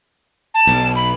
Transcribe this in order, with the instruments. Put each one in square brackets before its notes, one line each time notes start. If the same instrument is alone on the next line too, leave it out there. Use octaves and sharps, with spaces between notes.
[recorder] A5
[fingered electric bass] B1
[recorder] B5